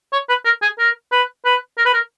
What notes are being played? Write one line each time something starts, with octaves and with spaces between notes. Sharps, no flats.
C#5
B4
A#4
G#4
A#4
B4
B4
A#4
B4
A#4